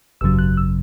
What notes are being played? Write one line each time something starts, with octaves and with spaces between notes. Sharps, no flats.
G#1 F#2 C#3 F#3 E6
F#6
E6